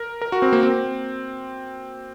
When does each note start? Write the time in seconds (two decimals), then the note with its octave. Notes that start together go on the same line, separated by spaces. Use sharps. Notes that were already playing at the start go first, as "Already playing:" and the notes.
Already playing: A#4
0.22 A#4
0.32 F#4
0.42 C4
0.53 A#3
0.63 C4